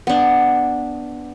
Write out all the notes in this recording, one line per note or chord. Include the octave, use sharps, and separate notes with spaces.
B3 D4